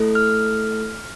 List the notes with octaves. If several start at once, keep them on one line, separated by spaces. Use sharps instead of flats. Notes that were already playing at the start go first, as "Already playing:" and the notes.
Already playing: A3 E4 A4
F6